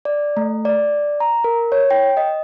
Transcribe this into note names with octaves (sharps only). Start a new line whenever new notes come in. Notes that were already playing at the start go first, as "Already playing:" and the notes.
D5
A3
D5
A#5
A#4
C#5
G5
D#5